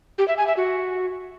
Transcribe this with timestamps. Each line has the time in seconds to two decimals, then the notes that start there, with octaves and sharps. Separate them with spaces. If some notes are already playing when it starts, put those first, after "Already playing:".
0.18 G4
0.28 E5
0.38 G#5
0.47 E5
0.57 F#4